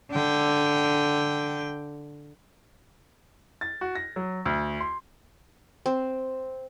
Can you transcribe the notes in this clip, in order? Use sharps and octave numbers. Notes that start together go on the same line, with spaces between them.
D3 G5
A6
F#4
A#6
F#3
D2
C6
C4